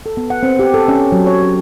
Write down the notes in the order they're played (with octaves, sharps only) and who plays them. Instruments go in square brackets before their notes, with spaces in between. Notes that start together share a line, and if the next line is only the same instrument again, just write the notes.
[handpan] A4
B3
F#5
C4
G4
A4
C#4
F#3
C#5
C#4